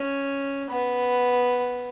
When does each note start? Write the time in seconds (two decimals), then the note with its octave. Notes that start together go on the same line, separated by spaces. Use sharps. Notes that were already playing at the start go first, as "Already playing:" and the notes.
Already playing: C#4
0.70 B3